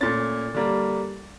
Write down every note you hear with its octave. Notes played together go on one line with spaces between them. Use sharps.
A#2 A3 C#4 A6
D3 G3 A#3